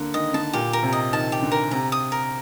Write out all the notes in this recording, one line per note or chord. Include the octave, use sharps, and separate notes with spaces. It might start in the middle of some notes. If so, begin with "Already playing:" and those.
Already playing: D3 A#3
D#3 D#5
D3 A5
A#2 G4
A#4
C3
D#5
D#3 A5
G4
D3
A#4
C3 A#5
D#6
A#4